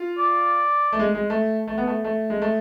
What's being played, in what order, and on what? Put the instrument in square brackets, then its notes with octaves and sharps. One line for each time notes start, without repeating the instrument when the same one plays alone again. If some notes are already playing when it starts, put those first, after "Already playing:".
Already playing: [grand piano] F4
[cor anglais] D5
[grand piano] A3
G#3
G#3
A3
A3
B3
A3
A3
G#3
A3